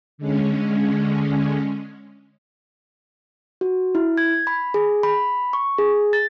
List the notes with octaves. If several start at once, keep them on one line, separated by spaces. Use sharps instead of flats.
D3 G#3 C#4
F#4
E4
G#6
B5
G#4
B5
C#6
G#4
A6